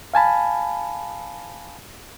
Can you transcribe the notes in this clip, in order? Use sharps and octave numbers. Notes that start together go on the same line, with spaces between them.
F5 G#5 A5 B5